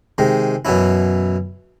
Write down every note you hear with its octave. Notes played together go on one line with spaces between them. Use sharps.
C3 D#3 G#3
F#2 B2 E3 C#4 E4